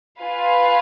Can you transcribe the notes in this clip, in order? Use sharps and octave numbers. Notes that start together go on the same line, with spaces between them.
F4 B4 F5 G#5